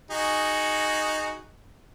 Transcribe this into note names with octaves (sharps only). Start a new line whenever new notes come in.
D#4 F#4 G#4